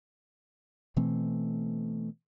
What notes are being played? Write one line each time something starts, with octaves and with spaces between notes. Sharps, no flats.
B2 E3 A3 C4